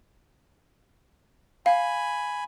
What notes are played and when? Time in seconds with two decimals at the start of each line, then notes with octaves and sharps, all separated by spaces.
1.66 F5 G#5 B5